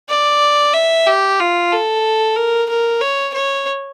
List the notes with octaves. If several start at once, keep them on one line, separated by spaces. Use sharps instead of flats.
D5
E5
G4
F4
A4
A#4
A#4
C#5
C#5